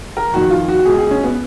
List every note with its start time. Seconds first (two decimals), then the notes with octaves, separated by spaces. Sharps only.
0.17 A#4
0.33 F2 D#3 F#4
0.50 F4
0.68 F#4
0.79 F#4
0.85 C#2 B2 G#4
0.98 G#4
1.11 C#4
1.24 B3